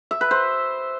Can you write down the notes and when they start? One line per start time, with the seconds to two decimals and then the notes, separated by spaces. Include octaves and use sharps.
0.11 E5
0.21 B4
0.31 C5